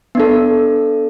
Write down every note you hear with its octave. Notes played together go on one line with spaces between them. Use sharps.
B3 D4 A4